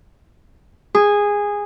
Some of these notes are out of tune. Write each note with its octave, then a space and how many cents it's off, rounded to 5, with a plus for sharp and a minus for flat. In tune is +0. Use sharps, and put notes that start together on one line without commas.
G#4 -15